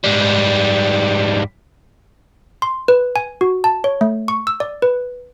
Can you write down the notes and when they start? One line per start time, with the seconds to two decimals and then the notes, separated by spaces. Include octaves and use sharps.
0.04 G#2 G3
2.62 C6
2.88 B4
3.16 G#5
3.41 F#4
3.64 A5
3.84 C#5
4.01 A3
4.28 C#6
4.47 E6
4.60 D5
4.82 B4